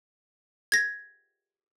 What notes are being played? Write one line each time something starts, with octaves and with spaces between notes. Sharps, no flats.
G#6 A#6